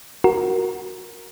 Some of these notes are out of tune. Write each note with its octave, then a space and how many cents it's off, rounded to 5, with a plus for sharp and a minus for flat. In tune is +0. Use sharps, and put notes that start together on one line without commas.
F#4 +0 A#4 +0